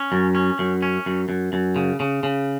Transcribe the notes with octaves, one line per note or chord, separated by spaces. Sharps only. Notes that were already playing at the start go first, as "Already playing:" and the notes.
Already playing: C#4
F#2
C#4
F#2
C#4
F#2
F#2
F#2
C#3
C#3
C#3